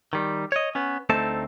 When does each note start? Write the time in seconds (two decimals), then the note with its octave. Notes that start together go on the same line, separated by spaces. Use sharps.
0.13 D#3 G3
0.52 C#5 D#5
0.75 B3 C#4
1.09 D2 A3 C4 D#4 A4 A5